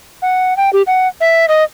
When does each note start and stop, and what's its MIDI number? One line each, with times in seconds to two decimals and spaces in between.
0.22 0.56 78
0.57 0.70 79
0.73 0.82 67
0.87 1.08 78
1.20 1.46 76
1.48 1.63 75